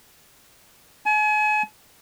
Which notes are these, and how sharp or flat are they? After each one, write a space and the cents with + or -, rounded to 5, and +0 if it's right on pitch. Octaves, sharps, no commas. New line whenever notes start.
G#5 +40